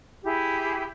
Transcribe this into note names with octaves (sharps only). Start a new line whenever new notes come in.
E4 G4 G#4